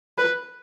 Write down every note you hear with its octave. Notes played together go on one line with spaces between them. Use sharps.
B4